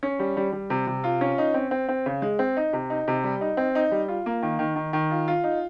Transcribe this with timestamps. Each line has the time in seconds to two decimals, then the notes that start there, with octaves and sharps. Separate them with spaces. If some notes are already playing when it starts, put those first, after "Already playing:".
0.03 C#4
0.19 G3
0.37 G3
0.52 G3
0.70 C3
0.87 C3
1.04 F4
1.21 C#4
1.38 D#4
1.54 C4
1.71 C4
1.89 C4
2.06 C#3
2.22 G#3
2.39 C4
2.57 D#4
2.73 C3
2.90 D#4
3.08 C3
3.24 G3
3.41 D#4
3.57 C4
3.75 D#4
3.91 G3
4.08 F4
4.26 A#3
4.43 D#3
4.59 D#3
4.76 D#3
4.93 D#3
5.11 F4
5.28 F4
5.44 D#4